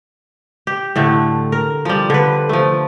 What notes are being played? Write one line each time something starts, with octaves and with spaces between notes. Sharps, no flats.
G4
A2 D3 A3
A#4
F3 G3
D3 B4
F3 A3